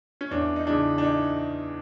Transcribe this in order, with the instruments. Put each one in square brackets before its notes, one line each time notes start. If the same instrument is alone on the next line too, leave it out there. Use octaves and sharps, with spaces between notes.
[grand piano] C#4
E2 D4
D#4
C#3 E3 D4
D4
D#4